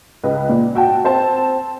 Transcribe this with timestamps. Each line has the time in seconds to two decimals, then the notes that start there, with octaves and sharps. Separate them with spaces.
0.24 C#2 B4 D#5
0.49 A#2
0.75 F#4 G5 A5
1.04 C4 C5 A5